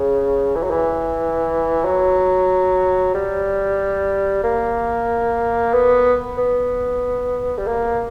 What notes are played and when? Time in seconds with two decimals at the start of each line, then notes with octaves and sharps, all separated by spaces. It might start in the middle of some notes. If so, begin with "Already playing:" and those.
Already playing: C#3
0.56 E3
0.63 F#3
0.70 E3
1.85 F#3
3.14 G3
4.44 A#3
5.73 B3
6.37 B3
7.58 G3
7.67 A#3